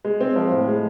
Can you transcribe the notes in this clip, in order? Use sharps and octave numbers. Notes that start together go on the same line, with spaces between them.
G#3
C4
F3
A2
G#3